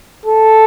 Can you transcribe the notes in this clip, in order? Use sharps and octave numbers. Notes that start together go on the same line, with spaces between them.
A4